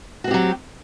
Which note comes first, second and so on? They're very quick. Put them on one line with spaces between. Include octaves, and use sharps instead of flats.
F#4 C4 G4 F#3